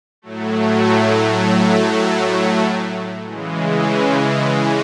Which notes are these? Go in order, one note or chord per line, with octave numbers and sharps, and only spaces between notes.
A2 F#3 A3
C#3 E3 G#3